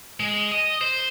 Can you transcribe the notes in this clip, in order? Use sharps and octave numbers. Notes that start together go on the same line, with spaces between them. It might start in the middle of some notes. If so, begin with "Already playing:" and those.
G#3
D#5
C5